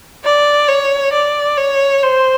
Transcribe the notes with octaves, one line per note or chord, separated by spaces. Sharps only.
D5
C#5
D5
C#5
C5